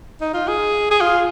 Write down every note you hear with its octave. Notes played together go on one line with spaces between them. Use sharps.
D#4
F4
G#4
G#4
F4